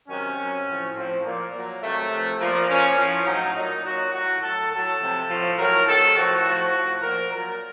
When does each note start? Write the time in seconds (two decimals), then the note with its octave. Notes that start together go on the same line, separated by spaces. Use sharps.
0.09 C3 D#3 F#3 C#4
0.37 C3 F#3
0.66 A2 F3
0.95 A2 F3 C4
1.24 A#2 F3 A#3
1.53 A#2 F#3
1.82 C3 D#3 F#3 A3
2.11 C3 F3
2.39 A#2 F3 A#3
2.69 A#2 F3 C#4
2.97 A2 F3 C#4
3.26 A2 F#3 D#4
3.55 A#2 F#3 D#4
3.84 A#2 F#3 F#4
4.13 A2 F#3 F#4
4.42 A2 F#3 A4
4.71 A2 F#3 A4
5.00 C3 F3
5.29 A2 F3
5.57 A2 F#3 A#4
5.86 C3 D#3 F#3 A4
6.16 A2 F3 F#4
6.44 A2 F3
6.74 A2 F3
7.02 A#2 F3 A#4
7.31 A#2 F#3 A#4